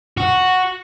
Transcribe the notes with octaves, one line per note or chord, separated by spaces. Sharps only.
F#4